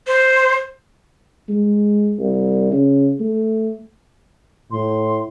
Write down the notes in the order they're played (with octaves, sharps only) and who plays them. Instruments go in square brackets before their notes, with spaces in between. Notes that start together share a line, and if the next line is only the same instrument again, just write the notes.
[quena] C5
[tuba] G#3
C2
C#3
A3
[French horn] A2 [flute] C6